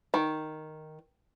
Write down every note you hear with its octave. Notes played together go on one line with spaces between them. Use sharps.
D#3